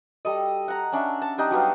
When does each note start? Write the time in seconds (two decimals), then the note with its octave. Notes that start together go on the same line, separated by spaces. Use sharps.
0.25 G3 A4 D#5
0.68 F#5 A#5
0.92 C#4 D4 E5
1.22 A5
1.38 G3 D4 D#4
1.51 F#3 G3 B3 F5